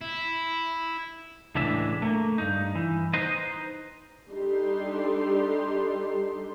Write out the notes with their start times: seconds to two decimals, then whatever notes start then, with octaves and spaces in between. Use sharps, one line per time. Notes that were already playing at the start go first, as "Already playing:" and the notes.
0.01 E4
1.55 C#2 A2 E3 G#3 D4 E5
2.02 A3 A#3
2.38 G2 D#4
2.75 E3
3.13 D#4 B4 C5 D#5
4.29 G3 D4 D#4 G4 A4 C6